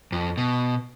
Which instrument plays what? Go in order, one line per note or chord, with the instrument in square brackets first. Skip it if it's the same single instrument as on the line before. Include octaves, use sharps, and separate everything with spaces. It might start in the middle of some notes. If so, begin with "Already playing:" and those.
[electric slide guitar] F2
B2